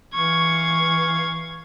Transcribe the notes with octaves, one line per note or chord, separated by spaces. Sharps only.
E3 F5 C#6 G#6